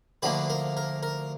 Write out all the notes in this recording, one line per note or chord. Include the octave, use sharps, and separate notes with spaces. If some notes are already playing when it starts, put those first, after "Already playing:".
D2 D3 F3 A#3 B4
A#4
A#4
A#4